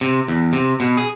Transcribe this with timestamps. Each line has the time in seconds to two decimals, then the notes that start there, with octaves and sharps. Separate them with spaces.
0.01 C3
0.28 E2
0.53 C3
0.80 B2
0.97 G#4